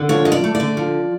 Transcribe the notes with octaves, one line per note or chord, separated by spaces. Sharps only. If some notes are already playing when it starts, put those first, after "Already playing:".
Already playing: D3
F3 C#5
D2 D#5
D5
A3
D5
D3
F3